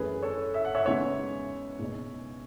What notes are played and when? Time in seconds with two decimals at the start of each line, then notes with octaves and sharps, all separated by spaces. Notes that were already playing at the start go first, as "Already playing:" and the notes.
Already playing: F#2 E3 A3 C#4 G#4 B4
0.23 A4 C#5
0.54 E5
0.65 F#5
0.75 C#5 E5
0.85 E2 C#3 G#3 D#4 C#5 E5
1.79 C#2 B2 G#3 D#4